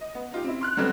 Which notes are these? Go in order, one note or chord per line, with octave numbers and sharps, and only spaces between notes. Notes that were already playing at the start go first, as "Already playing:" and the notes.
D#5
B3
D#4 F4 G4
C4 E4
C6 F6 F#6
D3 F#3 G3 A3 B3 C4